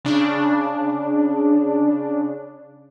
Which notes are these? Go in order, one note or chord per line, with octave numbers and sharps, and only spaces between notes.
C#3 D4